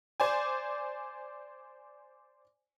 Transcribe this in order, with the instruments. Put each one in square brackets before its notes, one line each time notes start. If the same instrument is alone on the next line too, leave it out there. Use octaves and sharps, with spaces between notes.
[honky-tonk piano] C5 D5 G#5